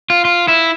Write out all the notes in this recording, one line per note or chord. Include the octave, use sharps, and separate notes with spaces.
F4
F4
E4